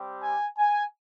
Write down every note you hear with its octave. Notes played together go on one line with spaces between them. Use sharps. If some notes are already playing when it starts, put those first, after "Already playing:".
Already playing: G3 C4 G4
G#5
G#5